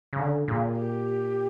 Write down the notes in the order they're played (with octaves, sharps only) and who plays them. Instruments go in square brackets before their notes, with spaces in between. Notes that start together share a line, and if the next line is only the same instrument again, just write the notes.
[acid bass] C#3
D3
[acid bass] A#2 [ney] G#4
[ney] G4